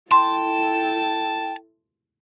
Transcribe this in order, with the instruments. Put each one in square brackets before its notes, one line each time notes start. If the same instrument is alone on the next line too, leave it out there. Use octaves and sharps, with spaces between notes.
[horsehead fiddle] E4 A4 [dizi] G5 [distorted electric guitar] A5 [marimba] C6